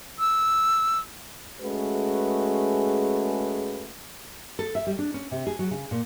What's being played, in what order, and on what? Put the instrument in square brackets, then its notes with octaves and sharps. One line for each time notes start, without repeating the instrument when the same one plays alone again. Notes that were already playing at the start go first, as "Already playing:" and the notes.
[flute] E6
[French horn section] G#3 A3 C#4 F#4 G#4 B4
[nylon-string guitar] A4
E5
G3
D4
C#4
C3
G#4
F#3
C#3
A#2